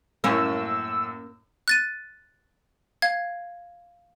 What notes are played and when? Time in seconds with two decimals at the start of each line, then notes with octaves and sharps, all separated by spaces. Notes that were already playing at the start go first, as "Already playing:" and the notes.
0.24 F#2 A2 A#3 C#4 E6
1.68 F#6 A6 D#7
3.02 F5 G#6